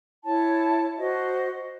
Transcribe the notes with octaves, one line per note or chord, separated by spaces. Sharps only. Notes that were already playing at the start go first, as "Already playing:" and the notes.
E4 C#5 A5
F#4 C5 D#5